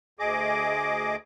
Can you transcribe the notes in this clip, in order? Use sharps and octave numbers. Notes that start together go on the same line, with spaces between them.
D2 G#4 D#5 D6